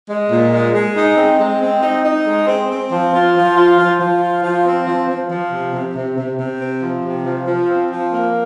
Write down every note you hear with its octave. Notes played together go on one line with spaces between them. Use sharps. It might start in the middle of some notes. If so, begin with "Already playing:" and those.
G#3
A#2
G#3
G#3
D#4
C4
G#3
C4
D#4
D#4
G#3
C4
C4
F3
F4
F3
F4
F3
F3
F4
F3
C4
F3
F3
F3
C3
C3
C3
C3
C3
C4
F3
C3
F3
F3
C4
F3
A#3